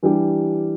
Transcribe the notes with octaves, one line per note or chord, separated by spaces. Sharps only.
E3 G3 D4 G4